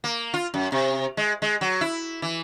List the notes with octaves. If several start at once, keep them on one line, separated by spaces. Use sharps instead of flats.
A#3
F4
F#2
C3
G#3
G#3
F#3
E4
E3